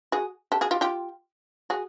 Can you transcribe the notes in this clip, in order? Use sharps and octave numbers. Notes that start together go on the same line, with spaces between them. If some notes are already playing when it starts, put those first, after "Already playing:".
F#4 G#4
G4 A4
F#4 G#4
F4 G4
F4 G4
F#4 G#4